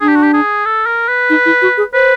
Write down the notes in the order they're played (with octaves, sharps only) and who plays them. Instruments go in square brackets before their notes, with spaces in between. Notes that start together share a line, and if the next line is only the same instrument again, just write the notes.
[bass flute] D4 [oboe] G#4
[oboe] G4
F#4
G4
G#4
A4
A#4
B4
[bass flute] D#4
E4
F#4
G#4
[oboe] B4 [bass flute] C5